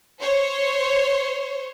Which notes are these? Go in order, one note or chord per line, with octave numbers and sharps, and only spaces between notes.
C5 C#5